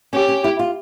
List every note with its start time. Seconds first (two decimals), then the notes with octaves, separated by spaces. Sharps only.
0.13 C#4 G4
0.28 C#4
0.44 E4
0.59 F4